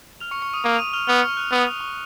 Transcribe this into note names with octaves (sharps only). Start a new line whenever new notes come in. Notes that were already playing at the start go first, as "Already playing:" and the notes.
F6 F7
C#6 C#7
C#6 C#7
D#6 D#7
A#3 D#6 D#7
F7
D#6 D#7
F6 F7
B3 F6 F7
C#6 C#7
F#6
B3 D#6
D#6
C#6